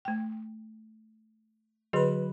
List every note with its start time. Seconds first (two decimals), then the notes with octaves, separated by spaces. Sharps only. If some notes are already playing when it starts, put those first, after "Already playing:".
0.05 A3 G5
1.93 D3 F#3 G#4 B4 D#5